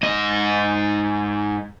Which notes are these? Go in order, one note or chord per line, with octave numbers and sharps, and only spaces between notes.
G#2 D#5